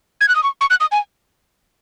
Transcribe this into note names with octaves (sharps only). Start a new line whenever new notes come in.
G#6
F#6
D#6
C#6
C#6
F#6
D#6
G#5